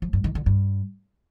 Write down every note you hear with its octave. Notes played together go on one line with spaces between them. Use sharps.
F3
G2
D#3
D3
G2